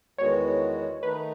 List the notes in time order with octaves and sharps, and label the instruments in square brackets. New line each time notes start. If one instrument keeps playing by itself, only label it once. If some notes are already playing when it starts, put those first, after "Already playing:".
[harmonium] E2 D#3 G#3 B3 F#4 [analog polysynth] C#5
[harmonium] D#3 A3 D#4 [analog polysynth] B4